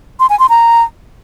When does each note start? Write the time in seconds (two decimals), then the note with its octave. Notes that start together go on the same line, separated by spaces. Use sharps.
0.20 C6
0.30 G#5
0.39 C6
0.49 A#5